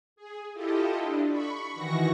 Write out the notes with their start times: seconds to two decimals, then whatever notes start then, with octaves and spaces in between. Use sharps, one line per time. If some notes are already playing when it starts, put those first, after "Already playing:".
0.16 G#4
0.53 E4 F4 G4 A4 D#5
0.98 D4
1.29 B5 C#6
1.73 D#3 E3 F#4 C#6 A#6